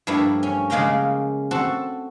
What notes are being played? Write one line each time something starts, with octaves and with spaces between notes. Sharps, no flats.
G2 F3 A3 A#3 E4
C#4
C#3 G#3 A#3 F5 G5 A#5
C4 F#4 A4 A5